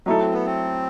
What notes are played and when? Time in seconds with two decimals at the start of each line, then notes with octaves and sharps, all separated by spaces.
0.06 F#3 A3 D#4 E4 A4
0.20 C4
0.33 B3
0.46 C4